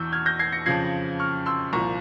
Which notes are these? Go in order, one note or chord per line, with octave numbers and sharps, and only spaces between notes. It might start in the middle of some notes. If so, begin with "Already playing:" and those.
Already playing: E2 E3 C#6 E6 G6
F6 G#6
G6 A#6
G#6 C7
A#6 C#7
F2 C#3 F3 G#6 C7
C#6 F6
C6 E6
C2 A#2 F3 A#5 C#6